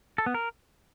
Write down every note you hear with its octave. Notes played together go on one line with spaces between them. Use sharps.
A4
B3
A#4